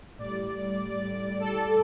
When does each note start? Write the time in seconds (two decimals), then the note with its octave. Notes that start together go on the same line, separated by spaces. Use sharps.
0.18 A2 G3 D5
1.40 A4